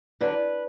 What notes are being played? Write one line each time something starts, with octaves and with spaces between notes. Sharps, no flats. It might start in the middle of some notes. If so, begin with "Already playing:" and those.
E2 D3 F#3 B3 D4 B4